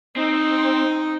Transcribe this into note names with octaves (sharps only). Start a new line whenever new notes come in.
C4 D#4